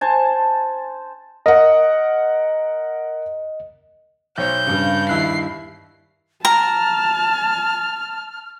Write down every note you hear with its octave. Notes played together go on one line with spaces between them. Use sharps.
C5 G#5 A5
A#4 D#5 F#5
B1 C5 C#5 G6
G2 C#3
D#2 E4 F#6 C7
A5 A#5 F6